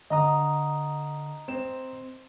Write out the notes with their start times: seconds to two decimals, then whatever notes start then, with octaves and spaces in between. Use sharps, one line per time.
0.10 D3 D#5 A#5 D#6
1.48 C4 E7